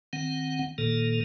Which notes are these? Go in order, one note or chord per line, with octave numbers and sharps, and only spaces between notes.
D#3 C4 F#5
A#2 D#3 A#3 A4